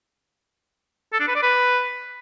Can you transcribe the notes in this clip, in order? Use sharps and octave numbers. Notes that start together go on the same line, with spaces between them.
A4
D4
B4
D5
B4